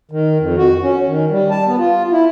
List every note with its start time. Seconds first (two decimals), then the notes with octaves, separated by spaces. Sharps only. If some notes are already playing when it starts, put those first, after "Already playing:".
0.11 D#3
0.40 F2
0.57 F#4
0.83 C#4
1.06 D#3
1.30 G3
1.51 A5
1.67 B3
1.78 F4
2.12 E4